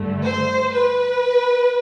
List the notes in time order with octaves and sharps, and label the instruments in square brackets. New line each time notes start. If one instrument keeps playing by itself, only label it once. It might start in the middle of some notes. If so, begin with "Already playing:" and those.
Already playing: [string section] G2 D3 A3
C5
B4